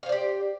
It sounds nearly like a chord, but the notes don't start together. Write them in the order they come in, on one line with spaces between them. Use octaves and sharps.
F5 C5 D5 G4